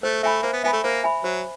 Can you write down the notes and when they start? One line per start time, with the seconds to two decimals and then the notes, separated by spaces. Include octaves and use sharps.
0.03 A3 C5
0.23 A3 E5 G#5 B5
0.43 A#3 C5
0.53 B3
0.64 B3 E5 G#5 B5
0.73 A3
0.84 A#3 C5
1.04 E5 G#5 B5
1.24 F#3 C5